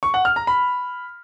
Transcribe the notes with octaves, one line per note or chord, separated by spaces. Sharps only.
C#6
F#5
F6
A#5
B5